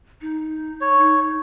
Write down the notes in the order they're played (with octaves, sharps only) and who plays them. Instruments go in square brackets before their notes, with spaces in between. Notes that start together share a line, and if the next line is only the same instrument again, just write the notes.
[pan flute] D#4
[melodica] C#5
[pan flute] D#4